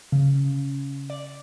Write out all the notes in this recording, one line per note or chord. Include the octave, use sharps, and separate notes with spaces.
C#3
D5